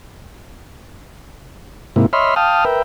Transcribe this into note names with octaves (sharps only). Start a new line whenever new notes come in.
G#2 C3 A#3 E4
C#5 D#5 E5 B5 C6 F6
F5 G5 A5 D#6 F6
A#4 B4 E5 G5